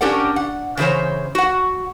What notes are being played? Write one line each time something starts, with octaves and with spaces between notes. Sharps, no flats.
C#4 D4 G4 A#4 D5 F#5
F#5
C#3 E3 E4 C5 C#5
F#4 F#5